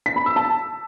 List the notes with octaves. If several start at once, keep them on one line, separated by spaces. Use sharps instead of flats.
B6
B5
E6
A5